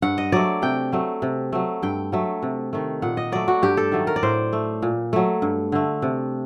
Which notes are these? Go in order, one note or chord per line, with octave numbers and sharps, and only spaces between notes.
G2 F#5
D#5
F#3 A3 D5
C3 G5
F#3 A3
C3
F#3 A3
G2 G5
F#3 A3
C3
D#3 A3
A#2 F#5
D#5
F#3 A3 D5
F#4
G2 G4
A4
D#3 F#3 A3
A#4
D5
A2 C5
A3
A#2
F#3 A3
G2
D3 A3
C3